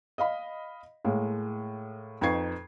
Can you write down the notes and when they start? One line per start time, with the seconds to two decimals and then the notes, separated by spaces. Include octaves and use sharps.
0.18 D#5 F5 B5
1.05 A2 G#3 A#3
2.21 F2 D#4 B4 C#6 G#6 C7